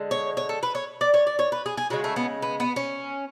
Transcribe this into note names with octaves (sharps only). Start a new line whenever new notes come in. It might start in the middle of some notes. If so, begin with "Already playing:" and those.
Already playing: D3 G#3
C#5
C#5
A4
B4
C#5
D5
C#5
D5
C#5
B4
G#4
G#4
C#3 F3 G#3 F#4
A3
B3
B3
B3
C#4